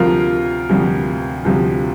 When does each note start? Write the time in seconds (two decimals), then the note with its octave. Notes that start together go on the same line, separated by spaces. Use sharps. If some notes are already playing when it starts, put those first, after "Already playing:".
Already playing: D2 C3 F3 F4 A#4
0.69 D2 C3 F3
1.45 D2 C3 F3